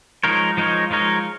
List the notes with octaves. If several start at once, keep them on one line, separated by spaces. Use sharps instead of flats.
F3 G#3 D#4 A#4 C#5
F3 G#3 D#4 A#4 C#5
F3 G#3 D#4 A#4 C#5